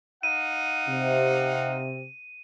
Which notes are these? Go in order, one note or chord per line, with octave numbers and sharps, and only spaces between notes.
D#4 F5 F#5 D#7
C3